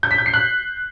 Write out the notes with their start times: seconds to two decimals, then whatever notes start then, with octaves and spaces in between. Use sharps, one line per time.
0.03 G6
0.11 B6
0.18 G6
0.26 C7
0.34 F#6